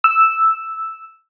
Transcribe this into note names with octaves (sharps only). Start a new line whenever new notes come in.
E6